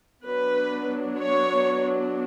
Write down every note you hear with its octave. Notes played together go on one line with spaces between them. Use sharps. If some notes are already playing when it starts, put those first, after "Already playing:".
F#3 B3 D4 B4
C#5